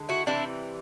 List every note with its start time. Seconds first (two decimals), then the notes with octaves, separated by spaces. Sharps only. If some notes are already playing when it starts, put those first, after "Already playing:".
Already playing: D3 G#3
0.09 E4 F#4
0.26 C3 E3 G3 D4 E4